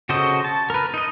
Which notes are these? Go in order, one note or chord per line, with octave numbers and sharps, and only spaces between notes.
C#3 F#4 A4 C5 D#5
A5
A#4 B4
D#4 D#5